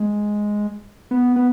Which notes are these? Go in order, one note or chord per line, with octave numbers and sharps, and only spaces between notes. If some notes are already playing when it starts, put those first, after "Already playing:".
Already playing: G#3
B3
B3